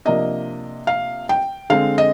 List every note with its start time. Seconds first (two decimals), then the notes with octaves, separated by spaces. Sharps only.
0.05 C3 F3 A#3 D4 D#5
0.87 F5
1.29 G5
1.70 D3 G#3 C4 F5
1.98 D#5